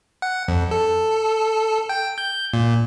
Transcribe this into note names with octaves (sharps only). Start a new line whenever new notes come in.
F#5
F2
A4
G5
G6
A#2